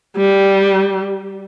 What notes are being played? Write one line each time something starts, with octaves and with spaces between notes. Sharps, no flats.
G3